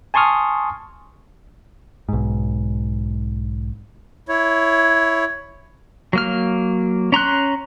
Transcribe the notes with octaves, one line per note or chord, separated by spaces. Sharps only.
G#5 A5 C6 C#6 D#6 F6
B1 G#2
E4 C#5
F#3 A#3 F6
C#4 A#5 C6 F#6